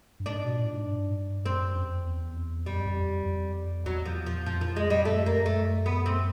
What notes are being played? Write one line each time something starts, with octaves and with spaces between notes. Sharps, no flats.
G2
G#2 D4
B2
A#2
A2
G#2
G2
F#2 C4
F2
E2
F2 G3
F#2
F2
F2
E2 F#3
F3
F3
F2 F3
F3
G#3
G3
F#2 A3
A#3
A3
B3
C4